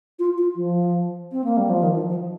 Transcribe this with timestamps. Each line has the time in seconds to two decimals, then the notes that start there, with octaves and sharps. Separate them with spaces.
0.19 F4
0.38 F4
0.56 F3
1.32 C4
1.44 A#3
1.57 G3
1.70 F3
1.83 D#3
1.96 F3
2.09 F3